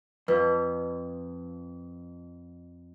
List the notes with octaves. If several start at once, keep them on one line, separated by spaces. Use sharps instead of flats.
F2 B4